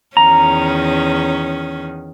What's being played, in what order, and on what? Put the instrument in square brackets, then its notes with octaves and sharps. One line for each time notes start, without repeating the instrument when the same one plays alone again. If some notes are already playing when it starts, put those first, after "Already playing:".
[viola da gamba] E2 D#3 C#4 [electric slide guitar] A#5